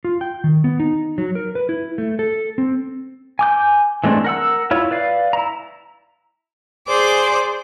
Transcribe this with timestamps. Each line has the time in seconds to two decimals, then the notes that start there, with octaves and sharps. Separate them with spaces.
0.04 F4
0.21 G5
0.44 D#3
0.64 B3
0.80 D#4
1.18 F#3
1.35 A#4
1.55 B4
1.69 E4
1.98 A3
2.19 A4
2.58 C4
3.39 G#5 D6 G6
4.04 E3 G#3 A3 C4 D4
4.24 A#4 F#5 E6
4.71 E4 F4 C#5
4.91 B4 D5 F5
5.33 E4 A#5
6.88 G#4 C5 D5 D6